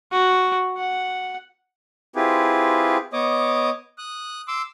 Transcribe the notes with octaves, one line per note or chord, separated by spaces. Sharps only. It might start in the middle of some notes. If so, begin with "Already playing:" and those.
F#4
F#5
C4 E4 F4 G4 G#4 B4
B3 C#5 D#5 D6 D#6
D#6 F#6
C6 D6 E6